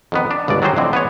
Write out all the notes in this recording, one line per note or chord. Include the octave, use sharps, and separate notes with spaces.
F2 D#3 B3
D4
G1 C#2 B2 D5
D#3 F#3 G3 G#4 C5 D#5
F2 A2 D3 C4
B3 G#4 C#5